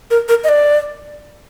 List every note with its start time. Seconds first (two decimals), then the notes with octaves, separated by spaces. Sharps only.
0.11 A#4
0.29 A#4
0.44 D#5
0.49 D5